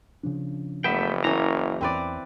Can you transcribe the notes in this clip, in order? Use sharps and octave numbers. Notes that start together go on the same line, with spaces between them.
C#3 F3 D4
F#1 A3 B3 E5 G5
E3 A#3 C#4 A#5
E2 C4 B4 D5